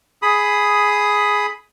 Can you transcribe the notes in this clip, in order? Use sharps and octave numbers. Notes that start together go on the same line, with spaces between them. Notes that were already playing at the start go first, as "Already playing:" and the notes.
G#4 B5 D#6